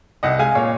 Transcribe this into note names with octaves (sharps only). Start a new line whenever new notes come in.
C2 D#5 F#5
G#3 F5 G#5
A#2 C#5 F5